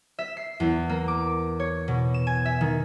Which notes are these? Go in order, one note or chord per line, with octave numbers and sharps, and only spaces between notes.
E5
C7
E2
A#3
D6
C#5
B2
E7
G#5
E5
D#3